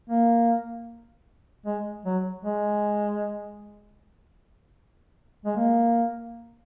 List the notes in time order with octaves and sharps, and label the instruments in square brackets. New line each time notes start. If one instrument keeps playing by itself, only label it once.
[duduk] A#3
G#3
F#3
G#3
G#3
A#3